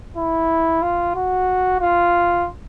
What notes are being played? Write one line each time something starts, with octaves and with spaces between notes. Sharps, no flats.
E4
F4
F#4
F4